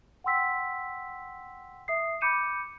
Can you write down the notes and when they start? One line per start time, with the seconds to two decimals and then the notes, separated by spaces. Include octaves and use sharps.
0.24 F#5 G5 C6 E6 B6
1.88 E5 D#6 C7
2.21 B5 D6 G6 C#7 D#7 E7